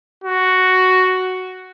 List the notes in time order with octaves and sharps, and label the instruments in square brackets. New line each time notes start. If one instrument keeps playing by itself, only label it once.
[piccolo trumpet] F#4